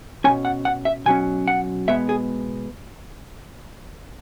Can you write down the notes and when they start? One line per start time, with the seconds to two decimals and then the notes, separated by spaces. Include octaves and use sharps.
0.24 B2 F#3 C#4 G#5
0.45 F#5
0.65 F#5
0.85 E5
1.06 B2 F#3 C#4 G#5
1.48 F#5
1.88 B2 G#3 B3 E5
2.09 G#4